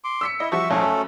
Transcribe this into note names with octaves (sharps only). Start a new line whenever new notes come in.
C6 D6
E6 B6 C#7
E4 D#5
F3 G3 F#4 E5 C#6
B1 F2 G#2 A3 C#4 A4
F#2